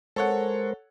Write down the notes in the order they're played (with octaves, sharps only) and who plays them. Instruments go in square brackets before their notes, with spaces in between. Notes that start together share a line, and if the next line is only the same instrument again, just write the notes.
[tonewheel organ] G#3 A#4 C5 [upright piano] A4 C#5 F#5